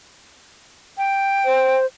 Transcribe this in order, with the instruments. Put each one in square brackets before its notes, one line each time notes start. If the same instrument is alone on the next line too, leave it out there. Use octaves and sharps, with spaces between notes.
[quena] G5
[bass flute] C5